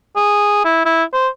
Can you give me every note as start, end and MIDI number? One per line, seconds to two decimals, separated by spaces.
0.16 0.60 68
0.65 0.83 64
0.85 1.04 64
1.13 1.28 72